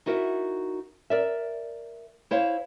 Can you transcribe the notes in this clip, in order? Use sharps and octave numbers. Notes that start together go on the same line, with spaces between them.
D#4 E4 F#4 A#4 D5 E5
A#4 D5 E5
E4 C5 C#5 F5